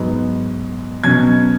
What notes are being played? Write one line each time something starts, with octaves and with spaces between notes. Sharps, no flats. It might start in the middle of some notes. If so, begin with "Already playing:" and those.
Already playing: G#2 F#3 B3
B2 F#3 C#4 G#6